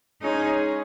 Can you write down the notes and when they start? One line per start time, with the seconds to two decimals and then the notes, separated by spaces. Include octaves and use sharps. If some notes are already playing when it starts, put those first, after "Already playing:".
0.22 G#3 C#4 D#4 G#4 C#5